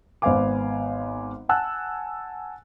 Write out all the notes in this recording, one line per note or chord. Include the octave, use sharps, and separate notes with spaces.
G#1 B3 C5 F5 G#5 D6
F#5 G#5 A5 E6 F#6